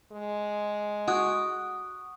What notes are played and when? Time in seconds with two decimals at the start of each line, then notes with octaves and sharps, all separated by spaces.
0.12 G#3
1.08 F#4 F#5 D#6 F#6